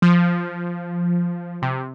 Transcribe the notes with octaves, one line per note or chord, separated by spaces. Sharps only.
F3
C3